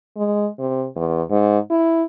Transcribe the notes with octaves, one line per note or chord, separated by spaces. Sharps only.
G#3
C3
E2
G#2
E4